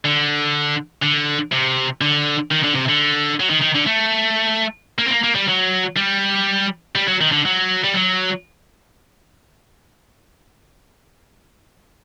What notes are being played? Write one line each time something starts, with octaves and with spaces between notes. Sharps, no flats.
D3
D3
C3
D3
D#3
D3
C3
D3
F#3
D#3
D#3
D3
A3
A#3
C4
A#3
A#3
G3
F#3
G3
G3
F#3
D#3
D3
F#3
G3
F#3